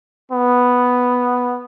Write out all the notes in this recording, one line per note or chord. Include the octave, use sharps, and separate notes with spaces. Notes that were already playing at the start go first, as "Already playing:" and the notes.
B3